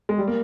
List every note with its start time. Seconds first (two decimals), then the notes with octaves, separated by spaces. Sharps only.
0.09 G#3
0.18 G3
0.28 A#3